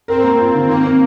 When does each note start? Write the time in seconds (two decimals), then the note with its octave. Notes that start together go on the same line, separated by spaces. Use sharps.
0.08 C4 A#4
0.24 A#3
0.39 F4
0.54 D#3
0.69 A#3 C4
0.84 C4